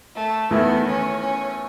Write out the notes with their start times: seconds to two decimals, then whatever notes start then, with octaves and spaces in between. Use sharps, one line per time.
0.16 A3
0.51 E2 D#3 A3 B3 E4
0.86 C#4
1.21 C#4